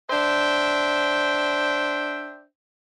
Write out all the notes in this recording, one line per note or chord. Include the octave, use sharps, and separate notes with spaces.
D4 C5 E5 G5